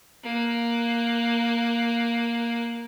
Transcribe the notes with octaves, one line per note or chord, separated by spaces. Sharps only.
A#3 F#6